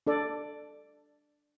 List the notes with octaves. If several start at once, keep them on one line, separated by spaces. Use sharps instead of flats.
D4 A4 D5